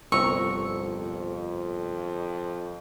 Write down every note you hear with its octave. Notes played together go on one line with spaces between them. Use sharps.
G1 C2 F2 A#5 C#6 E6